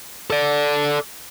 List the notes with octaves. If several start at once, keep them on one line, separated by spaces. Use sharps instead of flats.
A4 D5